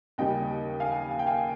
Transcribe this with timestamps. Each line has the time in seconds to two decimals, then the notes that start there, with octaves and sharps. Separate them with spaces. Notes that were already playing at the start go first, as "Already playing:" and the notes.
0.18 D#2 C#3 G3 C#4 D#5 G5
0.80 F5 G#5
1.11 G#5
1.19 G5
1.26 F5 G#5